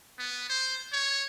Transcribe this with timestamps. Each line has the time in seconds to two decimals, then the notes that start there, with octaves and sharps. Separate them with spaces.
0.19 B3
0.50 C5
0.92 C#5